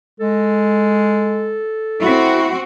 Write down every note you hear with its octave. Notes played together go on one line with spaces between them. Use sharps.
G#3 A4
C4 E4 F#4